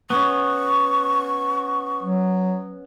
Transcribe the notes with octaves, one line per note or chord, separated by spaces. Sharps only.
B3 C#4 C#6
F#3